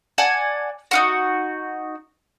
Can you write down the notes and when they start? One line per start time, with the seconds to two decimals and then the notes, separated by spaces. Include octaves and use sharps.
0.18 D5 F#5 G#5 A5
0.91 D#4 F4 F#4